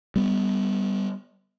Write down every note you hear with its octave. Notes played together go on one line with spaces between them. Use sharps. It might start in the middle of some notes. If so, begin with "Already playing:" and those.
G3 B3